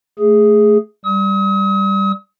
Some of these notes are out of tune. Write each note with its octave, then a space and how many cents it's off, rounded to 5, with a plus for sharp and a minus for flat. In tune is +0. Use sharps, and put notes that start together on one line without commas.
A3 +0 G#4 +0
G3 +0 D#6 +40